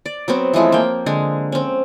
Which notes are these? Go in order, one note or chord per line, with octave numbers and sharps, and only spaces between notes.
D5
F#3 B3 C4
E3 F3 G#3 A3
A#3 G5
D3 G#3
C4 C#4